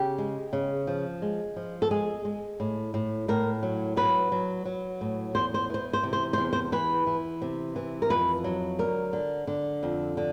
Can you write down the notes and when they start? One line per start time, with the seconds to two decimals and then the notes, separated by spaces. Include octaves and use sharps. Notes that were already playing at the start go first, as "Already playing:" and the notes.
Already playing: C#3 G4
0.18 G#3
0.53 C#3
0.87 F3
1.22 G#3
1.56 F3
1.82 A4
1.91 G#3 G#4
2.25 G#3
2.60 A2
2.94 A2
3.28 A2 A#4
3.63 F#3
3.96 F#3 B4
4.32 F#3
4.65 F#3
5.01 A2
5.35 E2 C5
5.54 C5
5.70 E3 C5
5.93 C5
6.03 C3
6.13 C5
6.33 E2 C5
6.53 C5
6.72 E3 B4
7.07 E3
7.42 C3
7.76 E3
8.02 A#4
8.10 F2 B4
8.44 F#3
8.79 D3 A#4
9.13 D3
9.47 D3
9.83 F2
10.17 D3